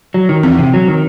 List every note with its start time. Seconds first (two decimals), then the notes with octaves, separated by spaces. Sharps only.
0.14 F#3
0.29 D#3
0.43 E2 C4
0.59 C3
0.74 F#3
0.88 D#3